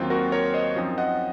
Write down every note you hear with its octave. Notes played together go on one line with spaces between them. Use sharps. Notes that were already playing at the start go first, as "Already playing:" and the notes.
Already playing: D#2 D#3 F#3 C4 F4
F#4 A#4
A#4 C#5
C5 D#5
F#2 F3 C4 D#4
D#5 F#5